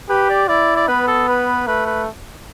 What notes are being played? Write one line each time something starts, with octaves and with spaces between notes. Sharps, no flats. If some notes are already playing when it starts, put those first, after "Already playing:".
G4 B4
D5
E4 D5
D5
B3 B4
A4
B4
A3 B4
B4